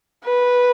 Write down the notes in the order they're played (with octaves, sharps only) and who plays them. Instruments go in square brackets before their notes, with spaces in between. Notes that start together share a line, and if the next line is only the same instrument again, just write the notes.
[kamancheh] B4